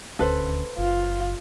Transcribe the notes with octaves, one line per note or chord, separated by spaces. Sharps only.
D#1 D2 C#4 A4 B4 C5
F#1 F4